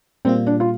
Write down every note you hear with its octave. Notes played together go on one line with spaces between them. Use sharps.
A#2 G3 A#3 C4 F4
D4
F4